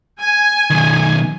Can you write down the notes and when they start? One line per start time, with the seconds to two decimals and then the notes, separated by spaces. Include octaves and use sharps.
0.20 G#5
0.70 B1 D#3